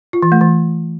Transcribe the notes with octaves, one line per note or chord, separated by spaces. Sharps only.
F4
E3
A3
E3